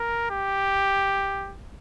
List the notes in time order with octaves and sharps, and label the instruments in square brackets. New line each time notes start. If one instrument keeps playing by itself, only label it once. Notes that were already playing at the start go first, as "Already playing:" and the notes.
Already playing: [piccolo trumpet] A#4
G4